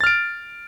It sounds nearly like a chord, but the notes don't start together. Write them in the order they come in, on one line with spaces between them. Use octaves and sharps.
A6 F6 D7